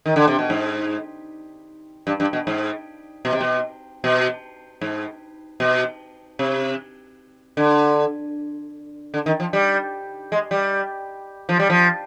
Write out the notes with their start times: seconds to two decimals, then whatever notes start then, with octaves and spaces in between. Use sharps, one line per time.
0.06 D#3
0.16 D3
0.27 C3
0.39 B2
0.50 G#2
2.07 G2
2.20 G2
2.33 B2
2.47 G#2
3.25 B2
3.33 C3
3.41 B2
4.04 B2
4.81 G#2
5.60 B2
6.39 C3
7.57 D3
9.14 D3
9.26 D#3
9.40 F3
9.53 G3
10.32 G#3
10.51 G3
11.49 F3
11.59 G3
11.70 F3